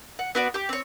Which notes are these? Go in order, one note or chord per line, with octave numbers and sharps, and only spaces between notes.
F#5
B3 F#4 D5
G4 D6
C4 C#5